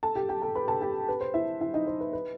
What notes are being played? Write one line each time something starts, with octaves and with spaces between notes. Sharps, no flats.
A4 A5
G4 G5
G4 G5
A4 A5
B4 B5
A4 A5
G4 G5
B4
C5
E4 E5
E4 E5
D#4 D#5
C5
B4
B4